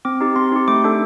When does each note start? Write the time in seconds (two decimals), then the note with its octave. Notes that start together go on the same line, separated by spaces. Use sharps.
0.05 C4 D6
0.21 D#4 G4
0.36 C4 C6
0.52 D#4 G4
0.68 A3 D6
0.84 D4 A4